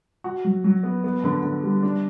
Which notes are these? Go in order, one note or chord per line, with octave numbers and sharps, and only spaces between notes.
F#4
F#3
F#3
B3
B3
D3
D3
G3
D4